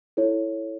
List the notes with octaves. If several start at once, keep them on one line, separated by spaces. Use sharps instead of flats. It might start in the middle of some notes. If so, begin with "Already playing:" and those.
E4 A4 C#5